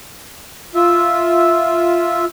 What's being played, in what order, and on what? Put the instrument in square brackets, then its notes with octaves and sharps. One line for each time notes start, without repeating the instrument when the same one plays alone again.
[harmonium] F4 E5